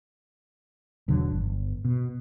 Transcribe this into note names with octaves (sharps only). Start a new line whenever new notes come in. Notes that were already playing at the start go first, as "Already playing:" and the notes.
E1 D3 F#3
G1
B2